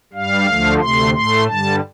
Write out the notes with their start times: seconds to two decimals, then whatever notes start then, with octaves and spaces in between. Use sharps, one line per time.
0.13 G2 G3 F5
0.47 D2 D3 F3 A3
0.80 D2 C3 A3 C6
1.14 A2 A3 C6
1.46 G2 D3 G3 A5